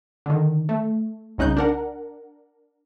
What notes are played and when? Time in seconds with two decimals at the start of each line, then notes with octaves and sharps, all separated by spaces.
0.26 D3 D#3
0.69 A3
1.38 C2 C#3 D#4 F#6 G6
1.57 D4 A#4 F#5